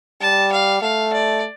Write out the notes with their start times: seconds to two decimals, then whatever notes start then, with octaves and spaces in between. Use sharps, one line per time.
0.21 G3 A5
0.52 F5
0.82 A3 F5
1.13 D5